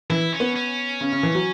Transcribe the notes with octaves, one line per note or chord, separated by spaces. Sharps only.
E3 E4
C#4
B3
C#4
C#3
C#3
E3
F#3